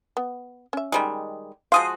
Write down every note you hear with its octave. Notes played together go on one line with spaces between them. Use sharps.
B3
C#4 E5
D#3 G3 G#3
F3 G#3 F#4 F5 C6 D#6